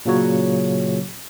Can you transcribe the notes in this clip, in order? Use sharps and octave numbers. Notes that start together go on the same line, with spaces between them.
A#2 C#3 F#3 C#5